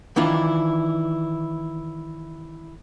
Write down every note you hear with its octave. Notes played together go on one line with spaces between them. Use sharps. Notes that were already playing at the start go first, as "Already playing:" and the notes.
D#3 E3 D4 E4 F4